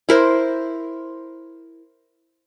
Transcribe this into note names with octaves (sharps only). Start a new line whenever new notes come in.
E4 A#4 C5